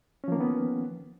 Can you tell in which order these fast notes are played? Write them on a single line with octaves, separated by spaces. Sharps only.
C#4 F3 A#3 D#3 B3